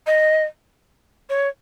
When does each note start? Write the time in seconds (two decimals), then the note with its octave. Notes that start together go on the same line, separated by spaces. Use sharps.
0.07 D#5
1.30 C#5